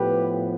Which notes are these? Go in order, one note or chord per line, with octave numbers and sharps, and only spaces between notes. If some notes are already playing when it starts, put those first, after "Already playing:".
Already playing: A2 F3 B3 G4 B4